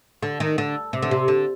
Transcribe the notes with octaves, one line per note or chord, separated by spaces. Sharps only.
D3
D#3
D3
C3
D3
C3
D3